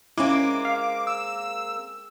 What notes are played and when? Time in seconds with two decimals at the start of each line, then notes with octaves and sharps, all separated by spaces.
0.18 G#3 A#3 C4 C#4 E4 D6
0.65 F5
1.07 E6